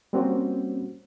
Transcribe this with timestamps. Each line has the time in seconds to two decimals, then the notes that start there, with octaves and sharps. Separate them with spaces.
0.13 G3 A#3 C4 C#4 F#4